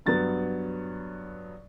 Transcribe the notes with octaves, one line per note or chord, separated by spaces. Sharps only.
G2 F#3 B3 A6